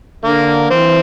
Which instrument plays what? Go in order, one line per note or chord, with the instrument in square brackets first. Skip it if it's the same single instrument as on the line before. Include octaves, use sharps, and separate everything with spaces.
[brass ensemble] D3 [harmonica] A#3
[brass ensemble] E3 [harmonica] C4